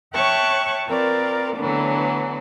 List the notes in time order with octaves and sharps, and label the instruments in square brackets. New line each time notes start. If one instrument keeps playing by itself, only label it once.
[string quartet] C#5 E5 G5 A5 C#6 F#6
C4 F4 A#4 B4 D5
D3 E3 F#3 A3 B3 D4